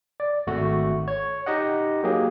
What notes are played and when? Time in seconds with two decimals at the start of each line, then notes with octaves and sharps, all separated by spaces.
0.20 D5
0.47 G#1 A3 F#4
1.08 C#5
1.46 D#4 G4 D#5 F#5
2.04 F#3 A#3 G4 G#4